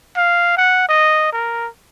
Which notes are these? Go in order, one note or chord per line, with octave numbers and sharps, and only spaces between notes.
F5
F#5
D#5
A#4